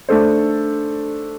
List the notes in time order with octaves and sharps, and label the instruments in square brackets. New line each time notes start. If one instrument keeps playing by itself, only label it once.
[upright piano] A3 D4 A4 C5